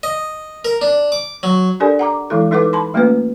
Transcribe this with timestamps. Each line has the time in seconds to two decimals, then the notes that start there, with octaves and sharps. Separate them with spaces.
0.03 D#5
0.65 A#4
0.81 D4
1.12 D6
1.43 F#3
1.80 D4 G4 A4 A#4 D5 G#5
1.99 F#5 A#5 D6
2.30 E3 G#3 E4 A4
2.51 G3 D#4 A4 B4 F#5 D6
2.73 A5 B5 C6
2.94 G3 A3 A#3 C#4 F4 B4